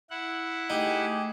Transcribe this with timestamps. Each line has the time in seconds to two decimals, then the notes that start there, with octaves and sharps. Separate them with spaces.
0.10 E4 F#5
0.70 A3 D#4 G4 G#4